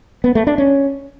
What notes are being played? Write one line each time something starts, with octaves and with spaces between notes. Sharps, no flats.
B3
A3
D4
C#4